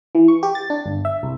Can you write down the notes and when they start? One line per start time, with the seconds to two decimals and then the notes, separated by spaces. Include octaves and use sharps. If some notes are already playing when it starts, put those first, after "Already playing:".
0.15 E3
0.28 C#6
0.43 G4
0.55 A6
0.70 D4
0.86 G1
1.05 E5
1.23 C2